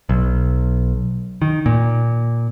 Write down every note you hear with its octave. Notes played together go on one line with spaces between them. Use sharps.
B1
D#3
A#2